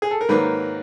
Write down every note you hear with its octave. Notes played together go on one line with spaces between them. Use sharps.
G#4
A4
A#4
G#2 D#3 F#3 A#3 B4